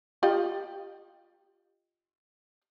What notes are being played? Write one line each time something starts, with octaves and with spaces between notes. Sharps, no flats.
F4 G4 D#5